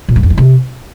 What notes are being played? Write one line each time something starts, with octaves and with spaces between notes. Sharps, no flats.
A#2
G2
F2
E3
C3